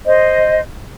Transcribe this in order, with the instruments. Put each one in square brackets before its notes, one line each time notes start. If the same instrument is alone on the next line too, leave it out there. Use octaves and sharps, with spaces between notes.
[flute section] C5 D#5